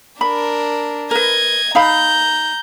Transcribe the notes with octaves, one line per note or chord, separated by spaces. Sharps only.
D4 A#4 B5
A#4 B4 D#5 G#6
D#4 F5 A#5 B5 G6